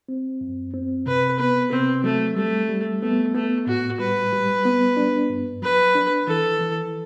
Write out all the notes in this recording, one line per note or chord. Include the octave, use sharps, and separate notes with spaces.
C4
F#2
C4
C3 B4
B3 B4
C3 C4
F#3 A3
G3 A3
G3
A3 B3
A3 B3
A2 F#4
G3 B4
G3
B3
D4
G2
F#3 B4
D4
E3 A4
E3